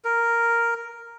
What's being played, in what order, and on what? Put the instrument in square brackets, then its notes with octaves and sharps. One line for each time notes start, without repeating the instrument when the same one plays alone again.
[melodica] A#4